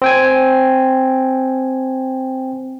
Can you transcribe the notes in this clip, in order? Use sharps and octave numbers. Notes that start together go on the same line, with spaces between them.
C4 G5 G#5